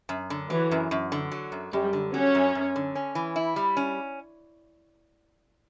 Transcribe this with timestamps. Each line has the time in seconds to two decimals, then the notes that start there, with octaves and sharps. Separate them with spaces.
0.09 F#2
0.30 D3
0.50 E3 F#3
0.71 F#2
0.91 F#2
1.12 D3
1.31 F#3
1.52 F#2
1.73 F#2 G3
1.93 D3
2.14 F#3 C#4
2.35 F#2
2.55 F#2
2.76 D3
2.96 C#4
3.15 E3
3.36 E4
3.56 G3
3.77 C#4